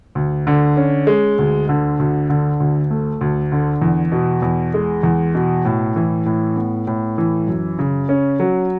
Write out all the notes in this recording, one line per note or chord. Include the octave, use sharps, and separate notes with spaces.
D2
D3
C#4
G#3
D2
D3
D2
D3
D2
A3
D2
D3
E2
B2
E2
G#3
E2
B2
A2
E3
A2
B3
A2
E3
F#2
C#3
C#4
F#3